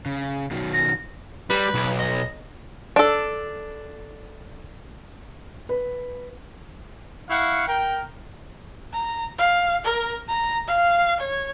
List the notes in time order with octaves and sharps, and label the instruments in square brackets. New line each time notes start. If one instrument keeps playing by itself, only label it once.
[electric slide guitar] C#3
B2 D#3 F#3
[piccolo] A#6
[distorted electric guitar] G3 [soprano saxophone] B4
[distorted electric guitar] B1
[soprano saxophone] D#5
[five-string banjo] D4 A4
[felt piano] B4
[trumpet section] E4 F5 F#5 C#6
A#4 G5
[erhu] A#5
F5
A#4
A#5
F5
C#5